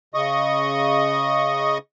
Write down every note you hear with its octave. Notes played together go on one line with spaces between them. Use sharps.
C#3 D#5 C#6 D#6